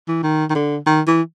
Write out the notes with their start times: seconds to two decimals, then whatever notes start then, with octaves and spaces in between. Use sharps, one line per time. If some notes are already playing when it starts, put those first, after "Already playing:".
0.08 E3
0.23 D#3
0.50 D#3
0.55 D3
0.86 D#3
1.07 E3